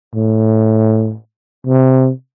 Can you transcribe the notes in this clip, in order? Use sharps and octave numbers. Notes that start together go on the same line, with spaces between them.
A2
C3